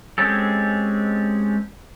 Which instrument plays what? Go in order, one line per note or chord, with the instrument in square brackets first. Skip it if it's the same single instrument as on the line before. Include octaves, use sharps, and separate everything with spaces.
[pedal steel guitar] G#3 C4 C#4 G4 A4